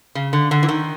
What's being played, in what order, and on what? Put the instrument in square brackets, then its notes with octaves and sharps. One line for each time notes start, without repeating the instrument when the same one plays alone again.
[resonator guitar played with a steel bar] C#3
D3
D3
E3
D#3